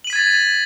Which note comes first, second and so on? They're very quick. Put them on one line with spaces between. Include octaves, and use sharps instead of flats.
F#7 D#7 B6 G#6 A6